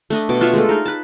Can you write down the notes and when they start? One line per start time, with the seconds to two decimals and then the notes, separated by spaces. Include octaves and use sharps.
0.10 A3 D4 D#5
0.29 B2 D6
0.41 D4 F4 C#5 E5
0.53 G#3 A3 A4
0.69 D#4 G#4 A#4
0.85 B4 A5